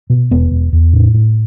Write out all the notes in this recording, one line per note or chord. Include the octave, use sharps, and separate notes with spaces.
B2
E1 B3
E1
E2
A2
A2